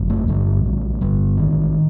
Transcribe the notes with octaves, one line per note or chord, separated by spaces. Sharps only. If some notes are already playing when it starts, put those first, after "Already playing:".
Already playing: G1 F#2
A3
A1 G2 D3 G3
A#1 A2
G1 G2 D3 G3
A1 A2 D#3